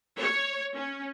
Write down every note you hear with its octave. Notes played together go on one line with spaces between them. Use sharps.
C#5
C#4